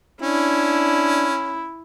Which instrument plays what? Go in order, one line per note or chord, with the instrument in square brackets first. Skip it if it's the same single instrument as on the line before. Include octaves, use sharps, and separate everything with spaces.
[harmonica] C#4 [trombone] D4 [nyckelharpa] E4